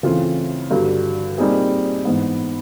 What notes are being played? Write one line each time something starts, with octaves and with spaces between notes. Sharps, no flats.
C#3 E3 A3 C4 F4
G2 D3 F#3
A#2 G3 C4 D#4 G#4
G#2 E3 G#3 B3